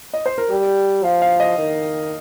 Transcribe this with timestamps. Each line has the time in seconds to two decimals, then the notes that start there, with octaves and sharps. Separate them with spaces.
0.14 D#5
0.26 C5
0.38 A#4
0.50 G3 G4
1.04 F3 F5
1.22 F5
1.40 D#5
1.58 D#3